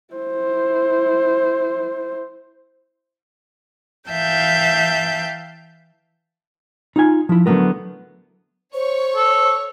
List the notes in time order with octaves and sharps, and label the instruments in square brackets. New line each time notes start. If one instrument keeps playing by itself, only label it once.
[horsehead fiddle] E4 C5
[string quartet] E3 E5 F5 G5 A5 G6
[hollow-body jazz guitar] D#4 F4 G#5
F3 E4
D3 F#3 A3 B3 A#4
[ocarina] C5 [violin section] C#5 C#6
[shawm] A4